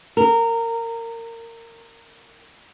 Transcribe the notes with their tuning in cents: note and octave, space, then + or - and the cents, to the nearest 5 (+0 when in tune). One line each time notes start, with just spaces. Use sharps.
A#4 -20